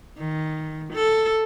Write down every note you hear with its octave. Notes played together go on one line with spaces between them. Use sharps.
D#3
A4